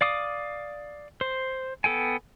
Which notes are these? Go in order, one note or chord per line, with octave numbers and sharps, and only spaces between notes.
D5 F5 D6 D#6
C5
B3 A4 G5 G#5